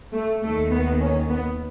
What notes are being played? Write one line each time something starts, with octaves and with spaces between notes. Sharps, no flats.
A3
D#2 D#3 A3
B3
C#4
B3